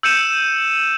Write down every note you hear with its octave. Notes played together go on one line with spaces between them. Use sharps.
E6 G6 C#7 D#7 E7